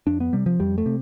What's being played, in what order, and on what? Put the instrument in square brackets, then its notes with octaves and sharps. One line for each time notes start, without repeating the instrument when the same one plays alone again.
[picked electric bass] F2 D4
B3
C3 G3
F3
F2 G3
A3
C3